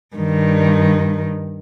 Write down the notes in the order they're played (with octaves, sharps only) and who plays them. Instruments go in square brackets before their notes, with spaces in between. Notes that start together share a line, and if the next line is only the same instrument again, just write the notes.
[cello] G2 D#3